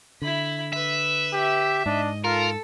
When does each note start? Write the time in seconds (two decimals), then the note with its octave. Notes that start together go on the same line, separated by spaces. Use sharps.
0.22 D3 E4 B5
0.73 B4 E5
1.33 G4
1.86 G#2 D4 D#5
2.24 F4 A4 A#4